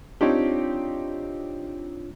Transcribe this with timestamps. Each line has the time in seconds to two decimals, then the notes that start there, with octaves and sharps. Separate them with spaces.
0.21 C4 D4 D#4 F4 G4 C#5